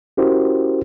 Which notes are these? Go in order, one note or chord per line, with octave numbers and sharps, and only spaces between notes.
C#4 E4 F#4 G4 A#4 C5